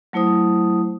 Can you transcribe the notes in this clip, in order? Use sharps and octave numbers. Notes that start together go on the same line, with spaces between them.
F#3 A3 E4 C5 D#6